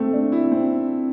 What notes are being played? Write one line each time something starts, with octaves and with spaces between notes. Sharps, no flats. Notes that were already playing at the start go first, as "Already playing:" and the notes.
Already playing: A3 C4
D4
E4
C4